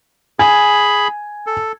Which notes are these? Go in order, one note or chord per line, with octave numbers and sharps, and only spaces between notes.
G#4 G#5 B5
A4